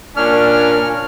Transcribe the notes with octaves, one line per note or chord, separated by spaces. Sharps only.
A#2 C#4 D4 F6